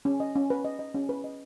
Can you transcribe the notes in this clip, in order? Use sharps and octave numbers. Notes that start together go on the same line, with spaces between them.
C#4
D#5
C#4
B4
D#5
D#5
C#4
B4
D#5